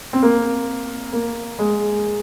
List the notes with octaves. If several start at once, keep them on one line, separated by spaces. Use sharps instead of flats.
C4
A#3
A#3
G#3